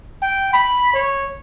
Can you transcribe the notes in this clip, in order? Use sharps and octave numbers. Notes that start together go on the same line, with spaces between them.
G5
B5
C#5